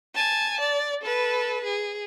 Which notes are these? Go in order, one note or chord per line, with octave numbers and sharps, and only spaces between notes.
G#5 A5
D5
A4 B4
G#4